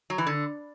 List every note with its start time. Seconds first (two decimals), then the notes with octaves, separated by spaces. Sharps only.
0.10 F#3
0.18 E3
0.27 D3